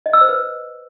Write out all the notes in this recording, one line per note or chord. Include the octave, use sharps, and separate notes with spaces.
D#5
E6
C5
B4